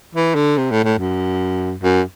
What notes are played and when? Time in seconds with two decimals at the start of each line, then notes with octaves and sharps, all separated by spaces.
0.15 E3
0.35 D3
0.57 C3
0.71 A2
0.84 A2
0.99 F#2
1.83 F#2